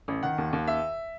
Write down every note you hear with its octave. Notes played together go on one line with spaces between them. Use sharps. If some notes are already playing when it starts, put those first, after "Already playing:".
A1
D#3 F#5
D#2
D#2
E5